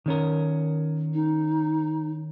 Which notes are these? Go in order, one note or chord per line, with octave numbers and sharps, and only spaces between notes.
D#3 C#4 A#4
D#4